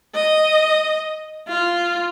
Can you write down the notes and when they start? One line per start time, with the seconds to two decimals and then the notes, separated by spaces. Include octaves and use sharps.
0.15 D#5
1.48 F4